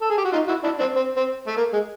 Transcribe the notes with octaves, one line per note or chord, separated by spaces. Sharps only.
A4
G#4
G4
F#4
D#4 F4
E4 F#4
D4 E4
C4 D4
C4
C4
A3
A#3
G#3